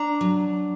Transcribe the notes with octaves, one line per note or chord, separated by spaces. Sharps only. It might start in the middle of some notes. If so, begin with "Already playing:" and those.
Already playing: D4 A#5
F#3